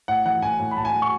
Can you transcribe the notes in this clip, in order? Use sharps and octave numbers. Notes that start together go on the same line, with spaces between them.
A2 F#5
E3 F#5
A2 G#5
A2
B5
A2 A5
G#5
A2
C#6